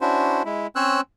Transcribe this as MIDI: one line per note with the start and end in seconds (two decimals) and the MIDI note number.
0.01 0.43 61
0.01 0.43 62
0.01 0.43 64
0.01 0.43 66
0.01 0.43 72
0.45 0.67 56
0.45 0.67 64
0.76 1.01 60
0.76 1.01 61
0.76 1.01 72
0.76 1.01 73
0.76 1.01 88
0.76 1.01 90